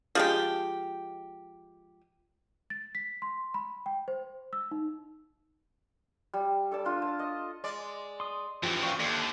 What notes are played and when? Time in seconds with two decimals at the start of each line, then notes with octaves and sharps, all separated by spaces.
0.15 F3 G#3 G4
2.70 A6
2.95 B6
3.22 C6
3.54 B5
3.86 G5
4.08 C5
4.53 E6
4.71 D#4
6.34 G3
6.72 A4 D5 A5
6.85 D4 F4
7.02 A5
7.19 D#5
7.64 G#3 D5
8.20 C6 D#6
8.63 F#2 E3 F3 G4
8.83 A#2 C4 F5 G5 C#6
9.00 D#2 D3 A3 A4